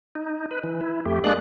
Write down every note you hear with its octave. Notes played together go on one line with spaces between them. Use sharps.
D#4
B4
E3
E4
F2 A3 G4
G#3 A#3 D4 G#4 D5 F#6